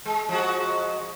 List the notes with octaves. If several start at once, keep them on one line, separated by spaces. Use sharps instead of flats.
G#3
F3 G#3 F#4